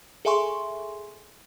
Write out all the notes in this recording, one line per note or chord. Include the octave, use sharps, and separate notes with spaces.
G#4 A4 E5 G#5 C6 C#6